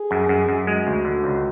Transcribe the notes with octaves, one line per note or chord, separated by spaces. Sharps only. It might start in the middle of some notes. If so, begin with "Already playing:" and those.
Already playing: G#4
F#2
F#2
F#2
G#3 F#4
D2
D3
C#2